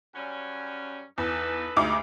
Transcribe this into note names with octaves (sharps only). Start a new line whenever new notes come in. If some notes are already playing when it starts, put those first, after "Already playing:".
F#2 G3 C#4
E2 D#4 A4 B4
D2 G2 F3 G#3 D#4 D6